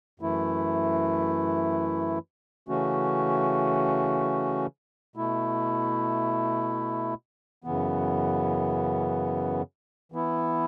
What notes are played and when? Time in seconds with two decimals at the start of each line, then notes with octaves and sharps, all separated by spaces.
0.20 F#2 E3 A3 E4
2.68 C#3 E3 A3 C#4 F#4
5.16 B2 A3 E4
7.64 F#2 C#3 E3 B3
10.12 E3 B3 E4